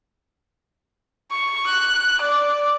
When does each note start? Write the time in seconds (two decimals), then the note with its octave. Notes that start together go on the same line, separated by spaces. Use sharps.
1.31 C#6
1.67 F#6
2.21 D5